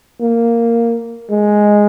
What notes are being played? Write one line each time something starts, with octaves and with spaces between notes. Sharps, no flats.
A#3
G#3